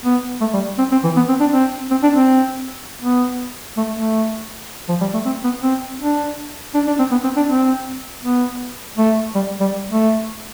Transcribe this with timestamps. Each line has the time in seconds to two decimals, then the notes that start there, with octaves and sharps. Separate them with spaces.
0.05 B3
0.41 A3
0.54 G3
0.78 C4
0.92 C4
1.04 E3
1.16 B3
1.29 C4
1.40 D4
1.53 C4
1.91 C4
2.03 D4
2.15 C4
3.02 B3
3.77 A3
3.96 A3
4.89 F3
5.01 G3
5.14 A3
5.25 C4
5.44 B3
5.63 C4
6.00 D4
6.74 D4
6.87 D4
6.99 C4
7.11 B3
7.24 C4
7.37 D4
7.50 C4
8.23 B3
8.98 A3
9.35 G3
9.60 G3
9.91 A3